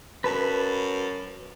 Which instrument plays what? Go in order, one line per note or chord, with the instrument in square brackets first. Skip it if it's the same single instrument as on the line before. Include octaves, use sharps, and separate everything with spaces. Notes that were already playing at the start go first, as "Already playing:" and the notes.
[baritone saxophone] F#2 [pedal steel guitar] B4 A5 B5